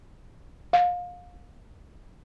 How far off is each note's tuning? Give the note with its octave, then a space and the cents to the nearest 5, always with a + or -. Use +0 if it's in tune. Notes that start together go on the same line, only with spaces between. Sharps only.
F5 +30